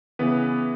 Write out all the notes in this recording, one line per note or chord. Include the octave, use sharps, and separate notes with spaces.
C#3 E3 B3 B4